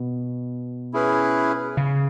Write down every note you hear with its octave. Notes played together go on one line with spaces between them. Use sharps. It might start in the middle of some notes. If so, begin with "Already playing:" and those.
Already playing: B2
C#4 E4 G#4 B4
C#3